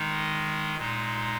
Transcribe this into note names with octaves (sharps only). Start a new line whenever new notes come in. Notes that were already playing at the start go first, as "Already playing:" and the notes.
Already playing: D#3 G#3 D#4
A#2 G#3 D#4